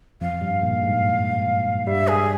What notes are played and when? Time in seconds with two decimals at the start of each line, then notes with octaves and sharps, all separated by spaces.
0.21 F2 F3 F5
0.41 G2 G3
0.62 A#2 A#3
0.82 G#2 G#3
1.87 G2 G3 E5
2.07 G#4